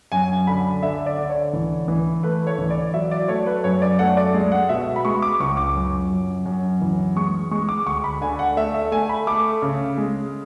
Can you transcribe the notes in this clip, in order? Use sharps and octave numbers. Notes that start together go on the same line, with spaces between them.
F#2 G#5
D3 B5
D3 E5
D5
D3
C#5
E3
E3
A3 B4
C#5
E3
D5
F#3 E5
D5
A3 C#5
B4
F#2 C#5
D5
A3 F#5
D5
G#3
F#5
B2 E5
B5
G#3 C#6
D6
C#2 C#6
D6
F#2
F#2
F#2
E3
G#3 C#6
G#3 C#6
D6
D2 C#6
B5
D3 G#5
F#5
A3 E5
E5
A3 G#5
B5
A3 D6
C#3
G#3